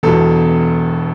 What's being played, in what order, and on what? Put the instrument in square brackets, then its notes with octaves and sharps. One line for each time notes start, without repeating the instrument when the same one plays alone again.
[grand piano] E1 E2 B2 A4